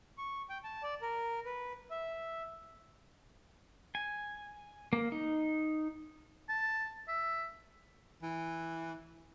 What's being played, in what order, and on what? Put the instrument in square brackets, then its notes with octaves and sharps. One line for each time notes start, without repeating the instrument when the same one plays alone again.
[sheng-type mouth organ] C#6
G5
A5
D5
A#4
B4
E5
[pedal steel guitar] G#5
A#3
D#4
[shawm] A5
E5
[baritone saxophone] E3